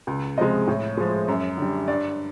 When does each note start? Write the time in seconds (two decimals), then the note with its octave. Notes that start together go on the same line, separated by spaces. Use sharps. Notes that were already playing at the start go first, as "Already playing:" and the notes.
0.07 C#2
0.37 C3 F3 G#3 D#5
0.67 A2
0.97 F3 G#3
1.28 F#2
1.57 D3 G3
1.88 G2 D5